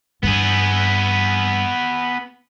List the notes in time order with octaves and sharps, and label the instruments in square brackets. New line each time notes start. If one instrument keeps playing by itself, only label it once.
[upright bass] G2 [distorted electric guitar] B3 G#4